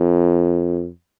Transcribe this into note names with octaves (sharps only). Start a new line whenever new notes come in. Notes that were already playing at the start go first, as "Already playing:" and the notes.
Already playing: F2